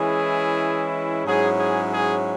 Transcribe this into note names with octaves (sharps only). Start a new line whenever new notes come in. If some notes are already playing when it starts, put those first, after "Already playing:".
Already playing: E3 G#3 C#4 E4 G#4
G#2 F#3 C#4 E4 G#4
G#4
G#4